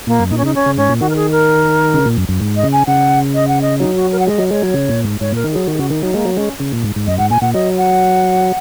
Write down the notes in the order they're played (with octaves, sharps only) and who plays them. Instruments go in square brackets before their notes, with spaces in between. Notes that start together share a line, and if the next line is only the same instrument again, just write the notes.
[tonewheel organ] A#2 [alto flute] A#3
[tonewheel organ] F#2
[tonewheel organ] A#2 [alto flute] D#4
[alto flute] C#4
[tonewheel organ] C#3 [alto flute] D#4
[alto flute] C#4
[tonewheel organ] C#3
[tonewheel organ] G#2 [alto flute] C#4
[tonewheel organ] A#2
[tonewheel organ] D#3 [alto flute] F#4
[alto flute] A#4
G#4
A#4
[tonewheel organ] C#3
A#2
F#2
F#2
G#2
[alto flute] D#5
[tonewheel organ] C#3
[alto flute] G#5
[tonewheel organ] C#3 [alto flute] F#5
[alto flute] D#5
F#5
D#5
[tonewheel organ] F#3 [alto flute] D#4
[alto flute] F#4
A#4
F#5
[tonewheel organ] G#3 [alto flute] D#5
[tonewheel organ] F#3
[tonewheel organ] G#3 [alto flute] C#5
[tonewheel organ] F#3
C#3
A#2
G#2
[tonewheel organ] G#2 [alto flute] C#5
[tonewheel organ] A#2 [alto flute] A#4
[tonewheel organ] D#3
[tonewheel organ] F#3 [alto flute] G#4
[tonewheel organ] D#3 [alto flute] F#4
[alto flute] G#4
[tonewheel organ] C#3 [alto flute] F#4
[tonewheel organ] D#3 [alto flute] D#4
[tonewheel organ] F#3 [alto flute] D#4
[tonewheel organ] G#3 [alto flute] A#3
[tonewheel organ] F#3
[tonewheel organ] G#3 [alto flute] C#4
[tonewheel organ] C#3
A#2
G#2
G#2
[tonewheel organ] F#2 [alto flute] D#5
[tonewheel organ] G#2 [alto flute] F#5
[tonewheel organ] A#2 [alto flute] G#5
[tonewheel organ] A#2 [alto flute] F#5
[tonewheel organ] F#3 [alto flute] D#5
[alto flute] F#5